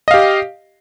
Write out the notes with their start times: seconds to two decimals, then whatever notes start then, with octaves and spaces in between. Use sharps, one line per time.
0.08 D#5
0.11 F5
0.14 G4